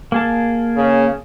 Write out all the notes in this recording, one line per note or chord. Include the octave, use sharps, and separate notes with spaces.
A#3 G#4 A5
C#3